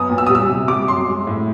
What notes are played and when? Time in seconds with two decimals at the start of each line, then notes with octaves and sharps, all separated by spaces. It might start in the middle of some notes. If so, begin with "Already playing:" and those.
Already playing: F#2 B3 D#6
0.09 A#2
0.18 E6
0.26 G3 D#6
0.35 E6
0.49 C3
0.68 G3 D6
0.88 F#2 C6
1.07 G#3
1.27 A2